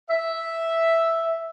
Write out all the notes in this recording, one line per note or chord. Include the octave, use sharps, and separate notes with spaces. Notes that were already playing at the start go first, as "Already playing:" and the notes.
E5